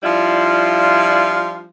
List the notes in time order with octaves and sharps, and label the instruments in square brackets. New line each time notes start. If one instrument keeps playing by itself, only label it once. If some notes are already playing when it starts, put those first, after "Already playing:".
[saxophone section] F3 G3 D4 E4 F4